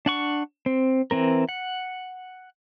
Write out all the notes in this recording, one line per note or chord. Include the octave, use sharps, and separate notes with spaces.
D4 F#5 C#6
C4
E3 C4 A#4
F#5